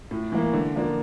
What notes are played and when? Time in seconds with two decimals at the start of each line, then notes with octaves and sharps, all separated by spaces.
0.11 A2
0.32 E3 A#3
0.53 D3
0.75 F3 A#3 D4